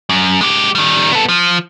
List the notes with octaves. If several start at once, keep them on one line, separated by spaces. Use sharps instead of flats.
F#2
G#3 G4
D#3 G3
B3 A4
F3